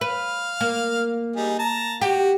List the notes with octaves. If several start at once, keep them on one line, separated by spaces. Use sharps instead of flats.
B4 F5
A#3
G3 D#4 G#4
A5 A#5
F#4 G4